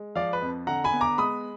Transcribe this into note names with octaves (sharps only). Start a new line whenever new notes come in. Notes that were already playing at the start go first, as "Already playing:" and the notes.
Already playing: G#3
F3 D5 F5
B4
F2
D3 F#5 A#5
G#5 B5
B3
A#5 D6
G#3 B5 D#6